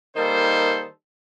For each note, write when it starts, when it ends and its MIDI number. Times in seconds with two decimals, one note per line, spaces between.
0.16 0.87 51
0.16 0.87 55
0.16 0.87 58
0.16 0.87 63
0.16 0.87 69
0.16 0.87 72